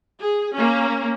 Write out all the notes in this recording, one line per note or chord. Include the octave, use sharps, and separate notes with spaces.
G#4
A#3 C#4